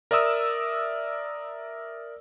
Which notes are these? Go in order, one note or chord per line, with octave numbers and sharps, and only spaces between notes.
A#4 D5 E5 D#6 E6